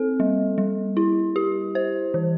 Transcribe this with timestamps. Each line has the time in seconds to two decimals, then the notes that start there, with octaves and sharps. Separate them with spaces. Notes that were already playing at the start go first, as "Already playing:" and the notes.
Already playing: C4 A4
0.20 G3
0.58 G3
0.97 E4
1.36 G4
1.75 C5
2.14 E3